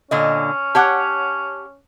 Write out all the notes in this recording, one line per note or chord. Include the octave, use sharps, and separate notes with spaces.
A#2 D3 C#4 D#5
G4 C#5 F#5 A5 D6 F#6